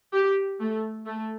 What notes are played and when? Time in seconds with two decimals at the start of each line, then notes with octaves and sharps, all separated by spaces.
0.13 G4
0.60 A3
1.06 A3